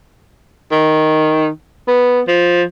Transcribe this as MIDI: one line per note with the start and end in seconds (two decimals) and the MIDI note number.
0.72 1.48 51
1.88 2.21 59
2.28 2.63 53